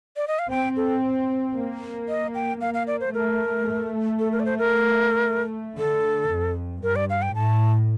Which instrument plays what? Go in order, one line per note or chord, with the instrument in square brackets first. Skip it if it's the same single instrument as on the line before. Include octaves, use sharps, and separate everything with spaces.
[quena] D5
D#5
F5
[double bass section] C4 [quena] G5
[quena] A4
[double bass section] A#3
[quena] D#5
G5
[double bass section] A#3 [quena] F5
[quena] F5
D5
C5
[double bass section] A3 [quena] A#4
[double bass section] A3
[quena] A4
A#4
D5
C5
A#4
[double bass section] D3 [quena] A4
[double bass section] F2
[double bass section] G2 [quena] A#4
[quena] D5
F5
G5
[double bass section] A2 [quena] A5